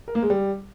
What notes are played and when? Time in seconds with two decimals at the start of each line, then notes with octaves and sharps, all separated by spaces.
0.08 A#4
0.15 A#3
0.23 G#3
0.30 G3